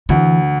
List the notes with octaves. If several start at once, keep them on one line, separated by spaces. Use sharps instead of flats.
D2 E3